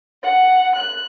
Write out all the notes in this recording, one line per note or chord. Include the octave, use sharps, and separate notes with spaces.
F#5
F#6